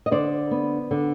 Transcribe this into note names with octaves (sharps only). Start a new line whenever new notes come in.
D#5
D3 C5 D5
B3
D3